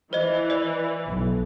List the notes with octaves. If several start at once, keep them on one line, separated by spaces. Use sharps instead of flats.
E3 C5 D#5
D5
B1